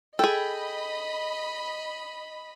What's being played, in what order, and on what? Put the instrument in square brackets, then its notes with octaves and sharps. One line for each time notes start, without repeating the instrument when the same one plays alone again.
[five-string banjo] G#4 A4 [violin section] D#5 B5 [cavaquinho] G5